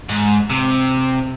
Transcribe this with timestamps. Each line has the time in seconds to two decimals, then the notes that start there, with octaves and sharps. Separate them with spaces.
0.09 G#2
0.50 C3